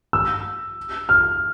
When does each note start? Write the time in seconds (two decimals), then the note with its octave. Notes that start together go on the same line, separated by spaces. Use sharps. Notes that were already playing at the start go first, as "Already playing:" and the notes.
0.13 E6
1.09 F6